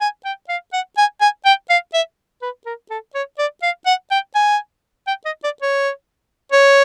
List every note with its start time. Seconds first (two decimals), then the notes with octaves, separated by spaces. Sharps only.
0.01 G#5
0.25 G5
0.49 F5
0.73 F#5
0.97 G#5
1.21 G#5
1.45 G5
1.70 F5
1.94 E5
2.42 B4
2.66 A#4
2.90 A4
3.15 C#5
3.39 D5
3.63 F5
3.86 F#5
4.11 G5
4.35 G#5
5.07 G5
5.25 D#5
5.44 D5
5.62 C#5
6.52 C#5